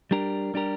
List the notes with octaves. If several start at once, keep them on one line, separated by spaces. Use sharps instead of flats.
G3 D4 G4 A#4
G3 D4 G4 A#4